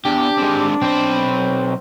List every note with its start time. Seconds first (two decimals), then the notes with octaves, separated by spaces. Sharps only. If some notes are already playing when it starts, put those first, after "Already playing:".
0.05 E2 D4 G4
0.38 G#3 C4
0.82 B1 C4 B5